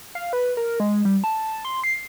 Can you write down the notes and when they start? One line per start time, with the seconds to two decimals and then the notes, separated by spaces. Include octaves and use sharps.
0.15 F5
0.33 B4
0.57 A#4
0.80 G#3
1.05 G3
1.24 A5
1.65 C6
1.84 C7